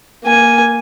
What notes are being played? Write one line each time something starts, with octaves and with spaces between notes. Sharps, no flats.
A#3 G#5